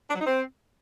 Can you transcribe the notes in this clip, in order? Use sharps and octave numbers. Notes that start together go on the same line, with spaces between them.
D4
F#3
D#4
C4